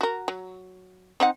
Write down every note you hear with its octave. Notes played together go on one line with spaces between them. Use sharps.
F#4 A#4
F#3
C4 D#4 F#5